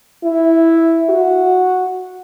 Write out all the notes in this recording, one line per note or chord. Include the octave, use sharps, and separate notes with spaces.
E4
F#4